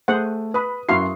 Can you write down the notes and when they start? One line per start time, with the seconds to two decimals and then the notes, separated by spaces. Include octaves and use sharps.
0.08 A3 G#4 C5 F#5
0.54 B4 B5 D#6
0.89 F#2 E4 F#4 F5 C6 C7